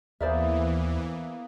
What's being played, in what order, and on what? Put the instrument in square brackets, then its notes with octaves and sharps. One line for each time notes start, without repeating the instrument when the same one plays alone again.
[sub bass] D#2 [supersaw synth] E3 [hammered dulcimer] A#3 B3 G#4 [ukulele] C5 D5 E5